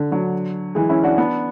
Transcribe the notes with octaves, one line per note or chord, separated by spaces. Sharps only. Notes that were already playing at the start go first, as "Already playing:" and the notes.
Already playing: D3
D3 F#3
E3 G#3
C#4 E4
D4 F#4
B3 D4